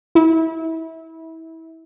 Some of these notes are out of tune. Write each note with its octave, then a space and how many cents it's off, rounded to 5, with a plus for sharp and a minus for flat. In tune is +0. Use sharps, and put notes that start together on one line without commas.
E4 -25